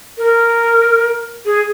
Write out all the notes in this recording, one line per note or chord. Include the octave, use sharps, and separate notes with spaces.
A#4
G#4